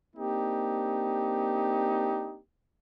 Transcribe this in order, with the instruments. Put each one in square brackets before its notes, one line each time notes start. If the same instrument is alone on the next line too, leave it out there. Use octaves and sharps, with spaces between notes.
[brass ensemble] A#3 C4 D4 D#4 G4